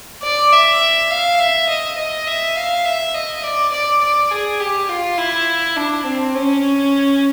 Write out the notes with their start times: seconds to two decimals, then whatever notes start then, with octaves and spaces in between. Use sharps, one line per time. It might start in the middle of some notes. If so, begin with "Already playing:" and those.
0.23 D5
0.53 E5
1.10 F5
1.40 E5
1.68 D#5
1.98 D#5
2.27 E5
2.56 F5
2.85 E5
3.14 D#5
3.43 D5
3.72 D5
4.02 D5
4.30 G#4
4.60 G4
4.89 F4
5.18 E4
5.76 D4
6.05 C4
6.34 C#4